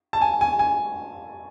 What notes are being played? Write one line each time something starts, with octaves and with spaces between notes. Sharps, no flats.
A5
G#5
G#5
G#5